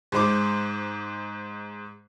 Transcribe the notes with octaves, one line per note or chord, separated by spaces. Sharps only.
G#2 G#3 C5 D6